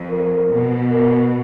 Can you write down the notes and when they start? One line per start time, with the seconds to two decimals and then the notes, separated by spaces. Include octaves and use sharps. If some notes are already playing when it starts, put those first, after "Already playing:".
Already playing: F2
0.10 A#4
0.50 B2
0.91 A#4